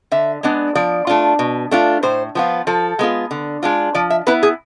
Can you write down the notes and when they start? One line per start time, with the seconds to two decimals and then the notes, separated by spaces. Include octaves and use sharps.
0.12 D3 E5
0.43 G#3 B3 D4
0.75 F3 D5
1.07 A3 D4 F4
1.39 B2
1.71 A3 D4 F4
2.03 A2 C5
2.35 F3 B3 F4
2.67 F3 A4
2.99 G#3 B3 F4
3.31 D3
3.63 G#3 D4 F4
3.95 F3 D5
4.10 E5
4.27 B3 E4 B4
4.43 G#4